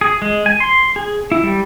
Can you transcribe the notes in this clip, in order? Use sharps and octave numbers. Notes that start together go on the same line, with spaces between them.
G#4
G#3
G#5
C6
G#4
E4
G3